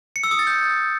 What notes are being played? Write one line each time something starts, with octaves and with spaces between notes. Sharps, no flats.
C#7
E6
D#6
A6
G6